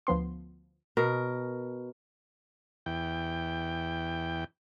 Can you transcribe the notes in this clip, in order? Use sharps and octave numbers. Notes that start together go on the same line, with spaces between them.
D2 F3 B3 C6
B2 A#4
E2 G5